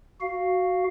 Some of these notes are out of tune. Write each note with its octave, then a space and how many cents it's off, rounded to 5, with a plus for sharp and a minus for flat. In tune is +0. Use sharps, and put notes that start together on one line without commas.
F#4 +0 F5 +0